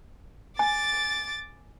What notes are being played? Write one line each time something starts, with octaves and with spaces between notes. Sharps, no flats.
G#5 D6 A6